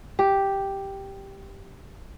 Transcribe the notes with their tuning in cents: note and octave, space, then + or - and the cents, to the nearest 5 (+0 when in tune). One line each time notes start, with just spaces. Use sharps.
G4 +0